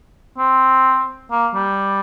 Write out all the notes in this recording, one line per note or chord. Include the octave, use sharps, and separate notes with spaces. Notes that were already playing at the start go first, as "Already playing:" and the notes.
C4
A#3
G3